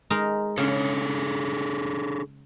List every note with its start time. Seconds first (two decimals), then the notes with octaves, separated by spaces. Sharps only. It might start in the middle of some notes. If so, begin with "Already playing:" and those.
0.10 G#3 D#4 A#4
0.58 C#3 D4 G#4 A4